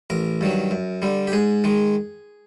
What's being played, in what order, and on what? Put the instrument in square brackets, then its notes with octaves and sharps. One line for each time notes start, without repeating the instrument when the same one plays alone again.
[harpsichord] A1 A#4
G2 D#3 F#3
F#2
D3 G3
G4
G#2 G#4
D#3 G#3